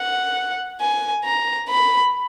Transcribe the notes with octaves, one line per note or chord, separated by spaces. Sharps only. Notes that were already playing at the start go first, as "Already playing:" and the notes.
Already playing: F#5
G#5
A#5
B5